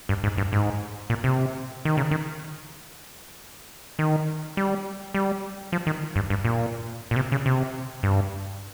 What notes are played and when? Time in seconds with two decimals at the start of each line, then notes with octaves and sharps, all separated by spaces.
0.09 G2
0.24 G#2
0.38 G2
0.52 G#2
1.10 A#2
1.24 C3
1.85 D#3
1.97 C#3
2.11 D#3
3.99 D#3
4.57 G3
5.14 G3
5.72 F3
5.87 D#3
6.16 G2
6.30 G2
6.45 A#2
7.11 A#2
7.16 C3
7.32 C#3
7.46 C3
8.03 G2